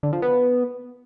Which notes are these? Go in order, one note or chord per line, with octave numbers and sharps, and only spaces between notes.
D3
F3
B3